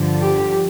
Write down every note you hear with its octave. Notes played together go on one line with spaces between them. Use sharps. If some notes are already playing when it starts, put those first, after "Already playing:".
Already playing: G2 D3 F3
G4